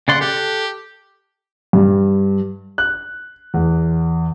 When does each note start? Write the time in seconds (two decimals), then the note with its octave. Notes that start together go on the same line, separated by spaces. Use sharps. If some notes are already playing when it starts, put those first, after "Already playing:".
0.08 C#3 D5 F#5 C6
0.21 G4 A4 F#6
1.73 G2
2.78 F#6
3.54 E2